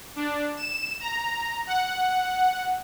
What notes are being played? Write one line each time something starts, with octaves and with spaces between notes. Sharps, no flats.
D4
E7
A#5
F#5